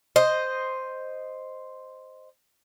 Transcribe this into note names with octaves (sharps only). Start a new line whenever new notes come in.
C5 D#5